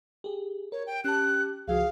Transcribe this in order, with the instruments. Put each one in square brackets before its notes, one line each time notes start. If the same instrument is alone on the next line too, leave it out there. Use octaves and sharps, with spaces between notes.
[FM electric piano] G4 G#4
[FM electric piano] A#4 [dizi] C#5
[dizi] G5
[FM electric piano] C#4 A5 [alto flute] G4 [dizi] F#6
[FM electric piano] C#2 F3 F#4 [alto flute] G#4 [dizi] F5